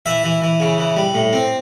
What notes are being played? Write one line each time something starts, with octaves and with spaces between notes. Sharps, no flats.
E3 E5
E3
E3
C#3
E3
G3
A2
C4